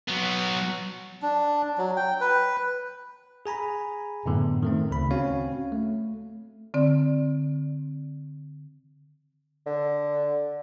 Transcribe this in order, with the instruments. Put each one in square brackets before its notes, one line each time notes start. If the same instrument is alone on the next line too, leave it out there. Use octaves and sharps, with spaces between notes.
[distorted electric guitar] F#3 B3
[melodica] D4
F#3
G5
B4
[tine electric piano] G#4 G#5 A#5 B5
F#2 A2 D3 B3
D#3 A3 C4
D2 C#3 B5
C4 C#4 F#4 C#5 F5
A3
[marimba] D3 C4 D5
[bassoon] D3